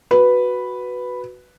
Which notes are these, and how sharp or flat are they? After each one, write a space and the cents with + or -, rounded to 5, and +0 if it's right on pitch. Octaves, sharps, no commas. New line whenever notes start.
F#4 +0 B4 +0